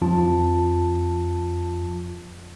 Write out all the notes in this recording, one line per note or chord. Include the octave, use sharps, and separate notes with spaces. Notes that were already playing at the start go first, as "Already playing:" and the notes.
F2 F3 F4 A5